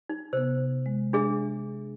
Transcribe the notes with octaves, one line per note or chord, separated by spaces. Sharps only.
D#4
C3 B3 C5
G#3
G#3 D4 G#4 E5